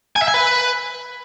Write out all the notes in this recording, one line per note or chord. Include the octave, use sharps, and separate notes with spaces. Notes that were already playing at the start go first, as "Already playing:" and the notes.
G#5
E5
G#5
B4